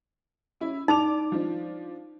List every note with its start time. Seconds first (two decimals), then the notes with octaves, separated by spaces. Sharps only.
0.61 C#4 E4
0.88 D#4 D5 D6 F7
1.32 F3 D4